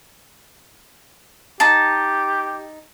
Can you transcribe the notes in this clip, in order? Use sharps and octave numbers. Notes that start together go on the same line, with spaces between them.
D#4 G4 A5